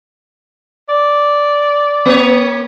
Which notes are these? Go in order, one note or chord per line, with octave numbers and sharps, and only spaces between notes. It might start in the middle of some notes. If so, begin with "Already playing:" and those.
D5
A#3 C#5